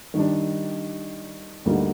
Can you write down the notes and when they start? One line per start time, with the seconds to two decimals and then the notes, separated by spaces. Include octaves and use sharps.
0.14 D#3 G3 D4
1.65 D2 D3 G3 A#3 D#4